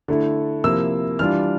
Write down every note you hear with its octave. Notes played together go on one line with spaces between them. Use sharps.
D3 A3 E4
C3 F3 A#3 E4 E6
E3 G3 D4 F4 F6